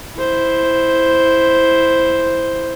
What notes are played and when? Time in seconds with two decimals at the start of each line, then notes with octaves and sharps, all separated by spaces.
0.16 E4 C5